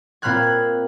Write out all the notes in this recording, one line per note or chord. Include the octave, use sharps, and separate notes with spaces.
A#2 C4 B5 F6 F#6 G#6